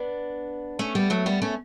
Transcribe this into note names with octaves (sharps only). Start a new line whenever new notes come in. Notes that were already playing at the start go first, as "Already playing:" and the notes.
Already playing: B3 D4
A3 C#4
G3 B3
F#3 A3
G3 B3
A3 C#4